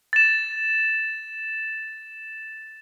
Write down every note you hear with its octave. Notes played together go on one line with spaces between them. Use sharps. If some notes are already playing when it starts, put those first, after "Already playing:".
A6 E7